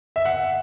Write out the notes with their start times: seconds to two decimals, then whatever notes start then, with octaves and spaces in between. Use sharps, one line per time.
0.16 E5
0.25 F#5